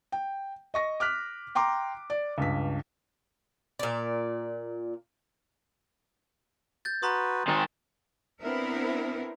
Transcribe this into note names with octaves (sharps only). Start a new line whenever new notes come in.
G5
D#5 C#6 A#6
D6 F6 F#6 B6
G5 A#5 C6 D6
D5
C#2 G2 B6
A#2 D5
G6 A6
F#4 B4 A#5 C6 D#6
D#3 G#3 C4 D#4
B3 C4 D4 E4 A#4